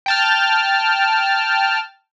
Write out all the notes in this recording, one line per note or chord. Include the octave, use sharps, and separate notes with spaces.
G5 A5 F6